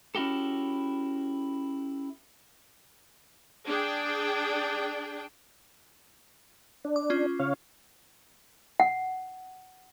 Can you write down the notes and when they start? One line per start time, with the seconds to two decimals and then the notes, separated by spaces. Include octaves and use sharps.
0.15 C#4 E4 F#4 G4 A4
3.67 D4 G#4 G5
6.85 D4
6.96 D6
7.10 C#4 F4
7.39 C#3 C#5 F5
8.80 F#5